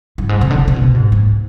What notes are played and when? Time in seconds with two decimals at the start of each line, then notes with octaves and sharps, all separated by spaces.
0.18 G2
0.29 G#2
0.41 C3
0.51 D3
0.59 D#3
0.68 C3
0.76 B2
0.94 G#2
1.12 G#2